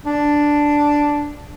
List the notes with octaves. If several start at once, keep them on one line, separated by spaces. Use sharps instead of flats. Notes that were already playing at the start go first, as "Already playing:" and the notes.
D4